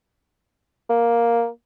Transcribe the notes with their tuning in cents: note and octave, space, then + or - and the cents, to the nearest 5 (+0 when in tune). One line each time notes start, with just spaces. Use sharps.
A#3 +5